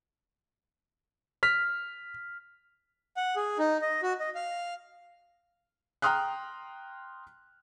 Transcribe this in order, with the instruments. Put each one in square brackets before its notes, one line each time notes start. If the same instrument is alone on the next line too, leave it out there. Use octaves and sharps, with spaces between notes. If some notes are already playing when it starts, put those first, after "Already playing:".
[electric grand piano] F6 B6
[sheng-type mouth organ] F#5
G#4
D#4
D#5
F#4
D#5
F5
[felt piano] G5 A#5 C6 D#6 F6 F#6